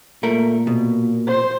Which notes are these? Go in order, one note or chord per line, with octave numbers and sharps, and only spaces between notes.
A#2 A3 A#4
B2
C5